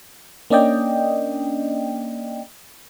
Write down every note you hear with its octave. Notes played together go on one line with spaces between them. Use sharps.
A#3 C#4 D4 D5 D#5 G5